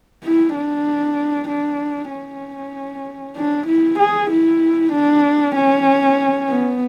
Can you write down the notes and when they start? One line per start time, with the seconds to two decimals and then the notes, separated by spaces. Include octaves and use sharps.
0.24 E4
0.55 D4
1.48 D4
2.11 C#4
3.36 D4
3.67 E4
3.99 G#4
4.30 E4
4.92 D4
5.55 C#4
6.48 B3